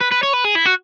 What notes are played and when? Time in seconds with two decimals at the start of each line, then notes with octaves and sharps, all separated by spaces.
0.01 B4
0.12 B4
0.23 C#5
0.34 B4
0.45 G#4
0.56 E4
0.66 F#4